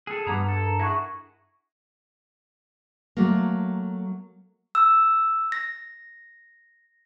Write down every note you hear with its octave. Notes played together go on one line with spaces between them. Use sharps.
G#4 A4
G2 G3 B3 A#5 G#6
A4 A6
D4 A#4 A#5
E4 F#4 G#4 C#6 G#6 A#6
F#3 A3 A#3
E6
A#6